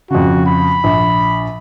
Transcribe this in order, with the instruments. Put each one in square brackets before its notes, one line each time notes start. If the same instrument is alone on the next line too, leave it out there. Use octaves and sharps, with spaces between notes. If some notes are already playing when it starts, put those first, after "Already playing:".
[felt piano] F2 C#3 [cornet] F#4
[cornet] B5
[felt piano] A#1